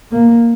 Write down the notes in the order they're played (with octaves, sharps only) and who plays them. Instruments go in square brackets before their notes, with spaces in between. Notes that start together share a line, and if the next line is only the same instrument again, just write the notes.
[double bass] A#3